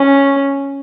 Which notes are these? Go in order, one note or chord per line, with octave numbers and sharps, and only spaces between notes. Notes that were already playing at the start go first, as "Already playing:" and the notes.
Already playing: C#4